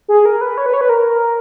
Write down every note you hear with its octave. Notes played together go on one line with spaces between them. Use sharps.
G#4
A#4
B4
C#5
B4
C#5
B4
A#4